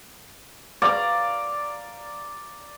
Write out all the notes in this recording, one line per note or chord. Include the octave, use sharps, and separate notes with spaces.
D5 F5 A#5